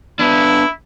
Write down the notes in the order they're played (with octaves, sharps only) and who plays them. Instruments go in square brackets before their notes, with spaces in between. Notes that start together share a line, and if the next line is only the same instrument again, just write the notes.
[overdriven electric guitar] B3 D4 [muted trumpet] E4